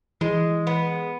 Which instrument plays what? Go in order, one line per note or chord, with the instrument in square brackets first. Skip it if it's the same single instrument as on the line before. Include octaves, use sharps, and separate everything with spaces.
[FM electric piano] E3 [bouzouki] G#3
[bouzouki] B3